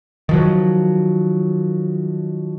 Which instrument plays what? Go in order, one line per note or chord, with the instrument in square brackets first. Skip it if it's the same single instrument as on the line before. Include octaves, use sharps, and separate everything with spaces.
[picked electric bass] D#3 F3 F#3